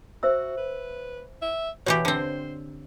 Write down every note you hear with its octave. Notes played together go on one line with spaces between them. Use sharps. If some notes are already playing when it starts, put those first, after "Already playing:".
F#4 C5 E5 E6
B4
E5
B2 E3 F#4 G4 C#5
D3 C4 C5